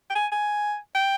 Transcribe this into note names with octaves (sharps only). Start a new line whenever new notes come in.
G5
G#5
G#5
G5